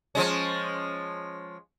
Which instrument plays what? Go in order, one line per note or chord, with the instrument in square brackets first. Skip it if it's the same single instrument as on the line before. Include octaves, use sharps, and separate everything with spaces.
[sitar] F3 G#3 C#4